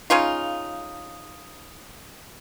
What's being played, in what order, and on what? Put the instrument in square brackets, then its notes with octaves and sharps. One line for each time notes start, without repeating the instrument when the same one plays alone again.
[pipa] C#3 C#4 D#4 F4